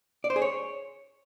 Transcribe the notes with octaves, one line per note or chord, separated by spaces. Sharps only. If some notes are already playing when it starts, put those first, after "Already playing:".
D5
C5
G#4
C#5